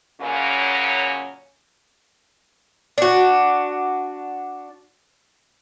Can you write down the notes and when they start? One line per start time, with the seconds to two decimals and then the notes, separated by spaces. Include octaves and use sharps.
0.20 F#2 A#2 C#3 F#3 A#3 C#4
2.98 D4 F#4